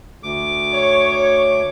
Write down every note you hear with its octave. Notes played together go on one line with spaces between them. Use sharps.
D2 D6
C#5